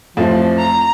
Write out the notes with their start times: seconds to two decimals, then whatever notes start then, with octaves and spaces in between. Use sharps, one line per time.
0.17 A1 F2 F3
0.59 A#5